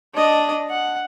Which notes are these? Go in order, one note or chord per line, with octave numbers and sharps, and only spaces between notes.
D4 D#5
F#5